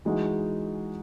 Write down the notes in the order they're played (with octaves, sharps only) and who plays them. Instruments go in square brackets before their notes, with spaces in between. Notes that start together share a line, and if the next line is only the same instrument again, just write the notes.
[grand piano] E3 G#3 D#4 F#4